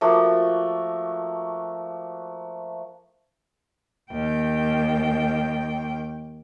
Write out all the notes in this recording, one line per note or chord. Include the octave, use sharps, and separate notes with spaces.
F3 A3 A#3 F#4
D#2 G5